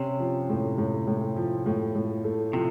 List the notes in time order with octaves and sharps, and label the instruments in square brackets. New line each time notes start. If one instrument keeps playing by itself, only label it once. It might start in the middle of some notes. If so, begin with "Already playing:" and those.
Already playing: [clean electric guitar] C3 [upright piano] C#4
[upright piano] F3
A2
A2
A2
F3
A2
A2
A3
[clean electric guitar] C3 [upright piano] F3